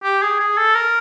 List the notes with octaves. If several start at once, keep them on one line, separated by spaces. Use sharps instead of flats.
G4
G#4
G#4
A4
A#4